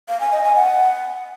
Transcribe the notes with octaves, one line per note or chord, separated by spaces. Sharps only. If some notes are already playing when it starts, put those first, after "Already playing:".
F5
G#5
D#5
G#5
F#5